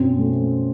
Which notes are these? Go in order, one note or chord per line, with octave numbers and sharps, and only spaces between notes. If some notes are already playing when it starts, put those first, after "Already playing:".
Already playing: F#2 B2 C4
A3